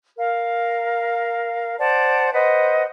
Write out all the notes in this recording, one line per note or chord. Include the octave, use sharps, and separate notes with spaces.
A#4 F5
C5 D5 F#5 A5
B4 C5 D#5 F#5